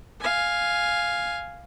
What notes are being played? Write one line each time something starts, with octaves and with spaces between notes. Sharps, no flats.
F5 G#5